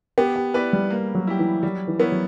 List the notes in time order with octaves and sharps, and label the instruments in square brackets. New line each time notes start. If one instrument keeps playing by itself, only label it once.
[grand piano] B3 [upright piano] G4
[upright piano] G4
[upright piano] B3 [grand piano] E4 B4 D5
[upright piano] G3
[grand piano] A#3
[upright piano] F#3
[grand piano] E4 G4
[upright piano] E3
[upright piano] F#3 [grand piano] G3
[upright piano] E3
[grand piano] B3 E4 A#4 C#5
[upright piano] F#3